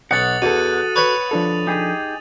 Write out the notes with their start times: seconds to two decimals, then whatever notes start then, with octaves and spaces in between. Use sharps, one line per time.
0.11 B1 F#5 D#6 A6 F#7
0.42 E2 F#4 A4 D#7
0.96 B4 C#5 B5 F7
1.31 F3 D4 A4
1.67 D#4 G4 G#4